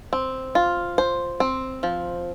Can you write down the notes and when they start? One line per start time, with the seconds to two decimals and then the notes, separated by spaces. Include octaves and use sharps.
0.13 C4
0.55 F4
0.98 C5
1.40 C4
1.83 F3